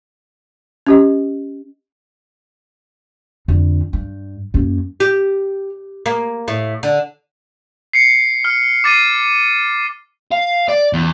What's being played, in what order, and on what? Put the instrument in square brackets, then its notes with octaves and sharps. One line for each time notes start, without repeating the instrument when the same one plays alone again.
[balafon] C#4 G4 D#5
[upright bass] F2 D3
G2
F#2 A#3
[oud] G4
A#3
A2
D3
[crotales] C7 C#7
F6
D6 A6 C7 D#7
[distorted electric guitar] F5
D5
E2